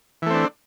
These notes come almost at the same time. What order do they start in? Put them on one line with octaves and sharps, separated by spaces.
E3 A3 C4 D4